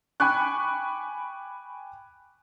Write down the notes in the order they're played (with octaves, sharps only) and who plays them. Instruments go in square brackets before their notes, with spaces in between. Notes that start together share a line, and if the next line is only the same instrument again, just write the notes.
[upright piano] G5 G#5 B5 C#6 D6 F#6